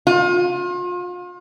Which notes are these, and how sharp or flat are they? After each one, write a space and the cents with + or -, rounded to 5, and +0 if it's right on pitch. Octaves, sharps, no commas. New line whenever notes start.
F4 +35